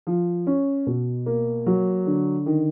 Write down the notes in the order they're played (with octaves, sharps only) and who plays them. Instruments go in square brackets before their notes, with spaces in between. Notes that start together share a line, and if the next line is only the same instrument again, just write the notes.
[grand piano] F3
C#4
B2
A#3
F#3
D3
D#3